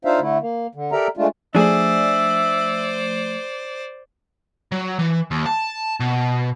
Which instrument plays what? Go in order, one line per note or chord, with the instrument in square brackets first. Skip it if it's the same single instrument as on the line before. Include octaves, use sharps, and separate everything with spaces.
[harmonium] D4 D#4 F4 C5 E5 F5
D3 A3 E4
A#3
D3
G4 A4 A#4 D5 E5 A#5
G#3 A3 D4 F4
[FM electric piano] F3 A3 [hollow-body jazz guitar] D4 G#4 [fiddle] C5 D5 [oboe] E5
[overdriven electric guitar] F#3
E3
D#2
A5
B2